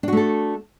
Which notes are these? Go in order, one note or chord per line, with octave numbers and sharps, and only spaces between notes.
A3 D4 F#4 A4